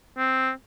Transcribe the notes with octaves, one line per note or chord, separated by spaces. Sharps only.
C4